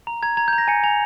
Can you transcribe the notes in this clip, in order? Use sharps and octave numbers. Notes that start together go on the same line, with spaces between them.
A#5
A#5 G#6
A#5 G#6
G6
A#5
A#6
G#5 C#7
G#5 F7